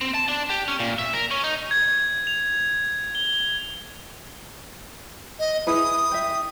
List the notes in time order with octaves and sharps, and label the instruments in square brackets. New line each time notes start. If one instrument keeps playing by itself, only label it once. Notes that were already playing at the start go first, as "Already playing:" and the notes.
[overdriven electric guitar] C4
A5
D4
G4
C#4
A#2
E5
A#4
C#4
D#4
[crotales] G#6
F7
G7
[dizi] D#5
[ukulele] E4 G#4 B4 [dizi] D#6
[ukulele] E5 G5